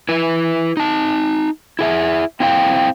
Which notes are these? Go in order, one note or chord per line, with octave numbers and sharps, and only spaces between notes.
E4 B4
D#4 A5
E4 G#4 E5
C4 E4 C5 F5 G5